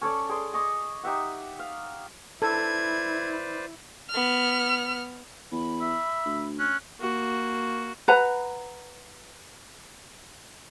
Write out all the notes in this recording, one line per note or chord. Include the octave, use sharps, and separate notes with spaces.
C#4 A4 C#5 D5
G#4 D5 C6
G#4 D#5 C#6 D6
D#4 G4 E5 F#5
F5
E4 A4 B4 C5 D5 G#6
B3 F6
E2 B5
E5
D2
C#4 F#6
A#3 F#4
B4 F#5 A#5